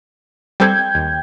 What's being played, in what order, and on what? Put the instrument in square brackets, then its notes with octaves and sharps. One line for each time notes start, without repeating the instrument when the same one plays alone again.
[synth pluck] G3 C4 A4 [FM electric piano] G5 G6 G#6
[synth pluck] D#2